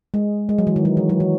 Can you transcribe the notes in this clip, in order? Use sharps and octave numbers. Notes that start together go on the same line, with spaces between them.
G#3
G#3
F#3
E3
D#3
F#3
E3
F#3
E3